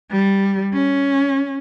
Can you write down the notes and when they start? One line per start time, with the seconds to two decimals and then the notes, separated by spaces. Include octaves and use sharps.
0.11 G3
0.73 C#4